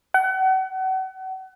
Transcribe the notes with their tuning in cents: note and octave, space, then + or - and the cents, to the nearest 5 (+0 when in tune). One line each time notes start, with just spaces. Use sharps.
F#5 +35